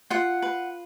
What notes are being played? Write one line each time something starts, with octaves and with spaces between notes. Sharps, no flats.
F4 F#5
B4